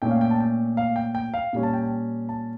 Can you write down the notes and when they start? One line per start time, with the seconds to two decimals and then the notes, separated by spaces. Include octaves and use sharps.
0.02 A#2 A3 C#4 G5
0.11 F5
0.21 G5
0.31 A5
0.40 G5
0.77 F5
0.96 G5
1.15 G5
1.34 F5
1.53 A#2 G3 C#4
1.63 A5
1.74 G5
1.83 A5
2.29 A5